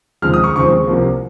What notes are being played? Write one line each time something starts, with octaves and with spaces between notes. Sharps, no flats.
D#2 C#3 F3 G#3 C4 F6
D#6
C#6
D#2 C#3 F3 G#3 C4 C#6
C2 C3 F3 A#3